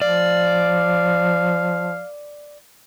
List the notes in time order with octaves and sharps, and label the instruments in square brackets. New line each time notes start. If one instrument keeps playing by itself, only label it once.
[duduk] F3 [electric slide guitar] D5 [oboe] F5